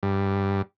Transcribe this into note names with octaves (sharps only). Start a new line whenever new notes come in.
G2